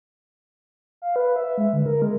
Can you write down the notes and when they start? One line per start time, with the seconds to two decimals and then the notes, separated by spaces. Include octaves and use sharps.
1.02 F5
1.16 B4
1.36 E5
1.58 G#3
1.73 D3
1.86 A#4
2.02 G#3